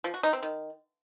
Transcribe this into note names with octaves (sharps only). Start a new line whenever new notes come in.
F3
F#4
D#4
C4
D#3